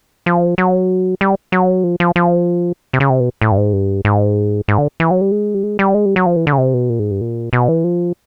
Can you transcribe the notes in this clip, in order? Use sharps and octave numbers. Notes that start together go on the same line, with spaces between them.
F3
F#3
G3
F#3
F3
F3
F3
C3
C#3
C3
B2
A2
G2
G#2
G2
G#2
G#2
D3
E3
F#3
G3
G#3
G3
G#3
G3
G#3
G3
F#3
F3
E3
D3
C#3
C3
B2
A#2
G#2
G2
A#2
B2
E3
F3